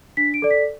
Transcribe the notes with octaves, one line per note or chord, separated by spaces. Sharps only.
D4 B6
D7
A4 D5
B6